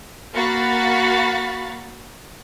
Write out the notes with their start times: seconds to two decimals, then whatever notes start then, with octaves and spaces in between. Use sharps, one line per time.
0.35 A#3 F#4 F5 B5 C#6 A6